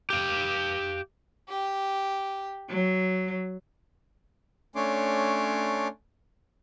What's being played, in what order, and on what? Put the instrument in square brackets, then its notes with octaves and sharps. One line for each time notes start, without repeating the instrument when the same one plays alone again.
[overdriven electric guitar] G4 F5
[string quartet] G4
F#3
[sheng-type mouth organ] A3 C#4 D4 C#5 C6 D6